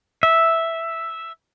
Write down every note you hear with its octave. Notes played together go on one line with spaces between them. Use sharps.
E5